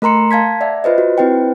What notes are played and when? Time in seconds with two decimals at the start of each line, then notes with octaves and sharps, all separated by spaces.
0.02 A3 A#4 A#5 C6 C#7
0.31 F5 A5 G#6 B6
0.61 D5 E5 F#5
0.84 F4 B4 C5 D#5
0.98 F#4
1.18 C4 E4 B4 C5 G5